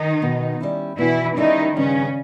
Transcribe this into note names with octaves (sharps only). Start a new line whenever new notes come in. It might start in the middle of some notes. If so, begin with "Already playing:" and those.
Already playing: D#3 D#4
B2
G3 C#4 E4
B2 E3 E4
D#3 G3 C#4 D#4 E4
G2 C#3 C#4